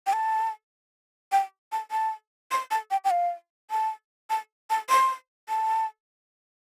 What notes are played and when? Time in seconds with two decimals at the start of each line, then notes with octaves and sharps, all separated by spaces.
0.07 G5
0.13 A5
1.32 G5
1.72 A5
1.91 A5
2.51 C6
2.71 A5
2.91 G5
3.05 G5
3.10 F5
3.71 A5
4.30 A5
4.70 A5
4.90 C6
5.49 A5